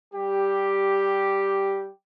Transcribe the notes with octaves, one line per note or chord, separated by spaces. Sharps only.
G3 G4